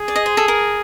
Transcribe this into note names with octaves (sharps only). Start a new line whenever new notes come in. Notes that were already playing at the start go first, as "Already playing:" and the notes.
Already playing: G#4
D5
D#5
C5
A4
A#4